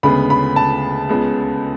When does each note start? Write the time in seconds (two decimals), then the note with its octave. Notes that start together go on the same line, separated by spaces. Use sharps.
0.03 D2 C#3 G#3 B3 B5
0.30 B5
0.56 A5
1.09 C#2 C#3 G#3 B3